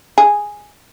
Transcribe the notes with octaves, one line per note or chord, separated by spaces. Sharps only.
G#4